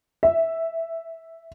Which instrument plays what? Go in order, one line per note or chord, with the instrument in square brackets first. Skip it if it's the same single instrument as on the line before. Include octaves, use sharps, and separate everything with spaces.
[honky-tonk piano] E5